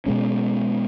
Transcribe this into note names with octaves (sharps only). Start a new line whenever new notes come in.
B2 G#3 C#4